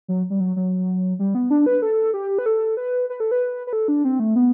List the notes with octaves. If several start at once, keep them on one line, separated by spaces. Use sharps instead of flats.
F#3
G3
F#3
F#3
G3
B3
D4
B4
A4
G4
B4
A4
B4
B4
A4
B4
B4
A4
D4
C4
A3
B3